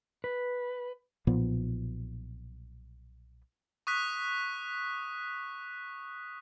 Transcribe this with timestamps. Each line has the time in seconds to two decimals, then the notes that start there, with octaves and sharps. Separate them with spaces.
0.24 B4
1.27 B1 A#2 F3 B3
3.87 C#6 D#6 F#6 B6